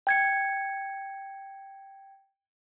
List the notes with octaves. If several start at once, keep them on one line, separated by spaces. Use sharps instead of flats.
G5 G#6 C#7